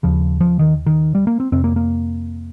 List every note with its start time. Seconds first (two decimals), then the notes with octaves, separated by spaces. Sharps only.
0.03 D#2 C#3 F3
0.41 F3
0.59 D#3
0.86 D#3
1.15 G3
1.27 A#3
1.40 C4
1.52 F2 C3 C4
1.64 A#3
1.76 A#3